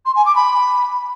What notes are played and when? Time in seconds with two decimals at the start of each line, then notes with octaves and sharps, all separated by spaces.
0.05 C6
0.15 G#5
0.25 D6
0.35 B5